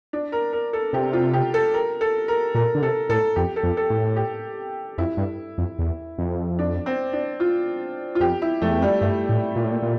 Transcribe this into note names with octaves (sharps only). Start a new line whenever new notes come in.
D4
A#4
A#4
A4
C3 G4
F4
G4
A4
A#4
A4
A#4
A#2 A#4
D3
C3 A4
A2 A4
F2 G4
A4
F2
A4
A2
G4
F2 E4
G2
F2
E2
F2
D4
C4
D4
F4
F4
F2 G4
E4
F2 A3
E2
F2
G3
G2 A3
A2
A#2
A2
A#2
A#2